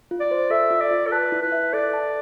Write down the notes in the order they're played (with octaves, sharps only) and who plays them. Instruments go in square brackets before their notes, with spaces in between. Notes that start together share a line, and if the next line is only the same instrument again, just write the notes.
[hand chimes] F4
[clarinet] D5
[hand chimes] C5
[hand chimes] A4 [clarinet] E5
[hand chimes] F4
[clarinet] D5
[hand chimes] F4
[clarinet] A4
[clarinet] B4 [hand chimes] A5
[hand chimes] E4
[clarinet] B4
[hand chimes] E5
[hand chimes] A4 [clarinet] D5
[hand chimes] A5